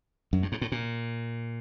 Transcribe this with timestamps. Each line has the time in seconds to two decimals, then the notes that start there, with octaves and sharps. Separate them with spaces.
0.33 F#2
0.43 G2
0.52 G#2
0.61 A2
0.72 A#2